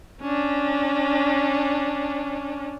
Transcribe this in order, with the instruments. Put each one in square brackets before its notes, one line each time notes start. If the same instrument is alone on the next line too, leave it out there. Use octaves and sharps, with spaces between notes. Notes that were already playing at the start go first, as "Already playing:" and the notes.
[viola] C#4 D4